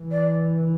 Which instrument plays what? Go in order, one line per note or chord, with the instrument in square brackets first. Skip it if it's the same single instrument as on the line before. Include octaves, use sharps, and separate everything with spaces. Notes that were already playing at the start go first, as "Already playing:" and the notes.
Already playing: [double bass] E3
[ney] D5